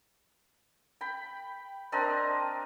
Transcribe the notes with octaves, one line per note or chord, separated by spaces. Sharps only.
G5 B5
C4 D4 A#4 D#5